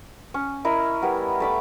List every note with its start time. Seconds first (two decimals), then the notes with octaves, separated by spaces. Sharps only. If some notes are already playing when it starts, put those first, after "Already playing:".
0.34 C#4
0.65 E4 A#4 D#5
1.02 G3 B3 A#4
1.40 A3 B5 D6